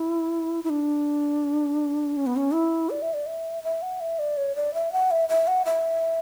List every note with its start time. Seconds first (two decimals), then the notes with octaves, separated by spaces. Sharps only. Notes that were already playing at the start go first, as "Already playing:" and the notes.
Already playing: E4
0.64 E4
0.70 D4
2.17 C#4
2.26 B3
2.36 C#4
2.54 E4
2.90 D5
3.02 E5
3.14 D5
3.27 E5
3.64 E5
3.82 F#5
4.01 E5
4.19 D5
4.37 C#5
4.56 D5
4.74 E5
4.92 F#5
5.11 E5
5.29 E5
5.48 F#5
5.65 E5